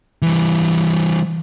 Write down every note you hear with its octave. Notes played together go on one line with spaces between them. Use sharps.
E3 G3